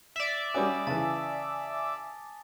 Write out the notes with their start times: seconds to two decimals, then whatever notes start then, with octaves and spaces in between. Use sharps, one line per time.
0.16 D5 E5 B6
0.54 G3 C#4 F#4 G#5 D6 D#6
0.87 C#3 E3 A5 A6